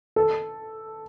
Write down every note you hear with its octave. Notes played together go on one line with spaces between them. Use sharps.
A4